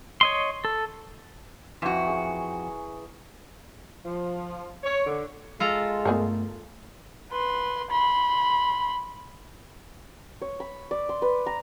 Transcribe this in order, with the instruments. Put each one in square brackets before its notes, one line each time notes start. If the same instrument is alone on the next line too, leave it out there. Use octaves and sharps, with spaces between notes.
[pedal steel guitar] C#5 D#5 C6
A4
[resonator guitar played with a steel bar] F2 F#4 [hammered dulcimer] E3 A#5 C#6
[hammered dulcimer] G#4 C#6
[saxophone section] F3
C#5
D3
[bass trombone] G#3 [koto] F4 A4 A#5
[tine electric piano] G2 A3 [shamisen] B3 G#4 A#4
[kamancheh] B4 C6
B5 C6
[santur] C#5
B5
D5
C6
B4
A#5